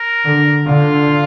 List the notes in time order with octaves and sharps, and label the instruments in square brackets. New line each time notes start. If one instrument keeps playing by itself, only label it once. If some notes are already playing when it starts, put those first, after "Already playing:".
Already playing: [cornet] A#4
[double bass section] D3
[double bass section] D3 [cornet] F4